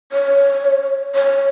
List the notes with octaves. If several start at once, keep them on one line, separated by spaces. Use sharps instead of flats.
C#5
C#5